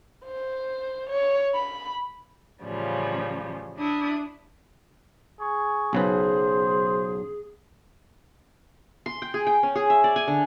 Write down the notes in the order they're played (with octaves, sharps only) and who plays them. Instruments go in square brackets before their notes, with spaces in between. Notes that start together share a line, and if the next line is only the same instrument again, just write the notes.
[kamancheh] C5
C#5
B5
[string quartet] A2 C#3 E3 F3 G3 C#4
D4 E4 D#6
[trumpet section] G#4 C#6
[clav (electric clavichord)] B1 C#3 B4 [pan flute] G#4 [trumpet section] C5
[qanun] C6
G5
G#4
G5
C#4
G#4
E5
D5
G#5
D3